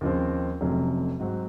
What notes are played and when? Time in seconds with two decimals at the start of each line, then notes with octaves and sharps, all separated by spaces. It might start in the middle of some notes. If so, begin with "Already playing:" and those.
0.01 D#2 C#3 F3 C4
0.61 F1 F2 C3 F#3 C#4
1.19 G#2 F#3 C4 F#4